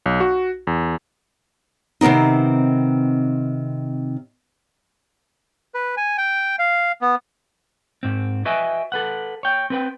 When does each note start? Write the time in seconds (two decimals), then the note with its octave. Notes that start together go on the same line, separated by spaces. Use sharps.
0.06 B1
0.20 F#4
0.67 E2
2.01 C3 D#3 B3 C4 D#4
5.74 B4
5.97 G#5
6.18 G5
6.59 F5
7.02 B3
8.03 G#2 C4
8.45 F#4 B4 D#5 E5 G5 G#5
8.92 A4 B4 F#5
9.43 C#5 G5
9.70 C4 B4 G5